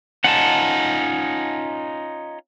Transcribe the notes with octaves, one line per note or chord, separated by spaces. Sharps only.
C#4 D#4 F4 F#5 A5